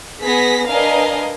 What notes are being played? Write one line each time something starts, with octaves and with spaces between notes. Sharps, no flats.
B3 G#4 A#6 B6
D4 A#4 B4 D#5 F5 G#5